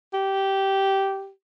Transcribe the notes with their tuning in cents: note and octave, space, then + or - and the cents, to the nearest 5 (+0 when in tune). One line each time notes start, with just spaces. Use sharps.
G4 -15